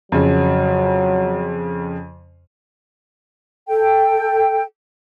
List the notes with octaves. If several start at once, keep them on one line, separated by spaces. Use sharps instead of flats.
F2 C#3 F#3
A4 G5